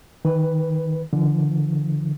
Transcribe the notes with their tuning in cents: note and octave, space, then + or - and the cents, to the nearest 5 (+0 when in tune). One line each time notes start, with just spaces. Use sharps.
D#3 +10 B4 +0
D3 +0 F3 -45